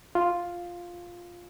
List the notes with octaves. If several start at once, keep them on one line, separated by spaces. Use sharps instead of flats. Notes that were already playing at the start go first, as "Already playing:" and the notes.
F4